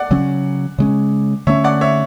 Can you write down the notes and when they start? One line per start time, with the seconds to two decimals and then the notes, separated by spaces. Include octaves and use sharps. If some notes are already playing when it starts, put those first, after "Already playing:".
Already playing: D5 F#5
0.11 C#3 F#3 C#4
0.78 C#3 G#3 C#4
1.47 D3 A3 C#4 C#5 E5
1.64 D5 F#5
1.81 C#5 E5